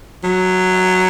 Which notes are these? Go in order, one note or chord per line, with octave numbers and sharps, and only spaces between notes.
F#3